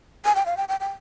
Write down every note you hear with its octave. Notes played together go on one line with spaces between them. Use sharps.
G#5
G5
F5
G5
G5
G5